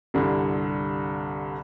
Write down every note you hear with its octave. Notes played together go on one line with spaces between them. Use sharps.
C2 G2 D3